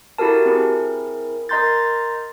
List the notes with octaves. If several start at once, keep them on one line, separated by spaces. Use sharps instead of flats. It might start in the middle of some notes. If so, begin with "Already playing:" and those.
E4 F#4 G4 A4 A#4 A5
C4 E4 G#4 A#4
A#4 D#5 A#5 C6 G6 A6